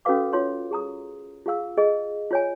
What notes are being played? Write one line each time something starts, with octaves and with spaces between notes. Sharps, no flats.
C#4 F#4 A4 B4 F5 D6
F4 C#5 C6
G#4 A#5 D#6
F4 G#4 F5 E6
G#4 D#5
F4 C#5 G#5